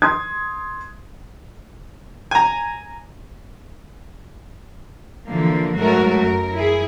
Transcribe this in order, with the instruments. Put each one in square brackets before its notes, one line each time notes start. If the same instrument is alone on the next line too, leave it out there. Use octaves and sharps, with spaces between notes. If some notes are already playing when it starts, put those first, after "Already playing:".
[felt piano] C6 D#6 G#6
[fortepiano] G#5 A#5
[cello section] D3 E3 F3 A#3
G#2 F#3 A3 F#4 A#4
F#2 A#4
E4 G#4